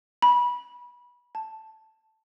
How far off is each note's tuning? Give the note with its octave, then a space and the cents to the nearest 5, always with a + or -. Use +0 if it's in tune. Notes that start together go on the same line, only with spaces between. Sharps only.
B5 -25
A5 +0